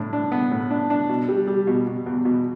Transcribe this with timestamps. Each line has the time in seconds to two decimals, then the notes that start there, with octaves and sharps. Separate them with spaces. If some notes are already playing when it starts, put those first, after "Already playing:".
Already playing: A2 D4
0.13 D4
0.32 B3
0.51 A2
0.70 D4
0.90 D4
1.09 B2
1.29 G3
1.47 G3
1.67 B2
1.87 B2
2.06 E2
2.25 B2